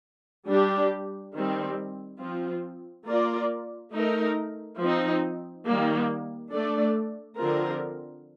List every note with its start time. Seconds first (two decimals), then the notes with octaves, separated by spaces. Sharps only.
0.49 G3 D4 G4
1.34 D#3 G3 C4
2.21 F3 C4 F4
3.07 A#3 F4 A#4 D5
3.94 A3 D#4 A#4
4.80 F3 C4 D#4
5.66 D#3 G3 A#3
6.53 A3 D4 A4 D5
7.39 D3 F3 C4 F4 A#4